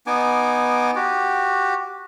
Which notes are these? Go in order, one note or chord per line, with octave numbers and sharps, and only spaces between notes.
B3 D#4 G#5 D6
F#4 G4